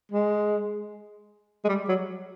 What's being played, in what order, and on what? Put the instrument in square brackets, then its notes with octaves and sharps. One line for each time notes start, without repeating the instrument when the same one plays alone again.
[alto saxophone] G#3
G#3
G3
F#3